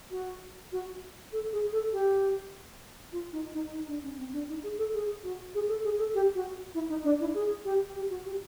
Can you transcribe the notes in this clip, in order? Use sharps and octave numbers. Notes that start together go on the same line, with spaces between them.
F#4
F#4
A4
G#4
A4
G4
F4
D#4
D#4
D#4
D4
C#4
C4
D4
D#4
G#4
A4
G#4
F#4
G#4
A4
G#4
A4
G4
F#4
E4
D#4
D4
E4
G#4
G4
G4
F#4
G4